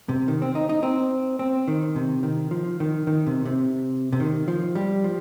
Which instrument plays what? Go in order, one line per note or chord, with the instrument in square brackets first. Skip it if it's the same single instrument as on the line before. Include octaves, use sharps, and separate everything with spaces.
[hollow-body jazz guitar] C3
D#3
C4
D#4
D#4
C4
C4
D#3
C3
D#3
F3
D#3
D#3
C3
C3
C3
D#3
F3
G3
F3